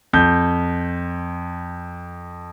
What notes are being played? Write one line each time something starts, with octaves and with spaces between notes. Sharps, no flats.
F2 G6